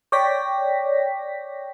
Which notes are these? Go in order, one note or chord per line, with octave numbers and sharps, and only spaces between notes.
C#5 D5 G5 A#6 B6